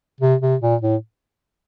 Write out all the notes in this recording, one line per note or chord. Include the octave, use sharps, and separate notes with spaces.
C3
C3
A#2
A2